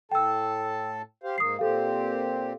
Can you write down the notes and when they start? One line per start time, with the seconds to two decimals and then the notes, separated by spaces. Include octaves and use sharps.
0.12 A2 A4 G5 A5 E6
1.23 G4 C5 F5
1.38 G#2 A#3 D#6 C7
1.59 A#2 C4 G4 A4 F5